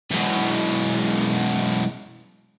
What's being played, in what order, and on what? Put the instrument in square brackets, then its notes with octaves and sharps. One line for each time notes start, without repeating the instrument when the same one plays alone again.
[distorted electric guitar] F#2 B2 [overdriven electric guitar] E3 G#3